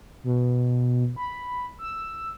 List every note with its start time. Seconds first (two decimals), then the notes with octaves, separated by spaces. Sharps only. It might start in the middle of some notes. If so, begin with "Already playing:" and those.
0.24 B2
1.16 B5
1.79 E6